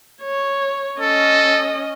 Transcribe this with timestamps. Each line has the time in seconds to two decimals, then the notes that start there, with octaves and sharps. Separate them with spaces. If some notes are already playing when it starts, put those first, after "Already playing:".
0.22 C#5
1.00 C#4 A4 D#5